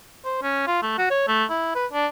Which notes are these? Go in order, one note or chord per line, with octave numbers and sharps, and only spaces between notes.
C5
C#4
F4
A3
F#4
C#5
A3
E4
B4
D4